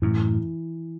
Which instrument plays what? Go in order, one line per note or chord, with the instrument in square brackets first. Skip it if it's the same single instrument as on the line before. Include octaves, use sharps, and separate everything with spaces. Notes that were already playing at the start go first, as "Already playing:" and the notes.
[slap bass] F#2 A2 [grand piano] E3